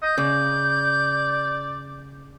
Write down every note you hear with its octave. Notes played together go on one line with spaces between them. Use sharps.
D#5 G6
C#3 D5